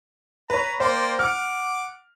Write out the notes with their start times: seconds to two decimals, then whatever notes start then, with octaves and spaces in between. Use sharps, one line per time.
0.50 B4 C#5 A#5
0.80 A#3 C5 D5 G5
1.19 F#5 D6 F6